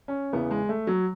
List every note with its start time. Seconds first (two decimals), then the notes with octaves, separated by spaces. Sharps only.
0.08 C#4
0.33 E2 C#3 E3 B3
0.51 G#3
0.69 A3
0.87 F#3